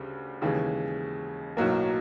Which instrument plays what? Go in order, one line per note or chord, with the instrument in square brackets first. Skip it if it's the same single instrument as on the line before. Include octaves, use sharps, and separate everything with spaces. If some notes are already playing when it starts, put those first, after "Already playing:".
Already playing: [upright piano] D2 C#3 G3
D#2 C#3 E3 G#3
B1 A2 F#3 A#3